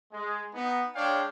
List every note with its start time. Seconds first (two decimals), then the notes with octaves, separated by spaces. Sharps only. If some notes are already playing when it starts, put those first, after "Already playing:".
0.12 G#3
0.54 B3 D#4
0.95 G#3 D4 C#5 F5 G5